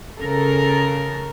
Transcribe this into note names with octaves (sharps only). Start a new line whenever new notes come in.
C#3 A4 A#4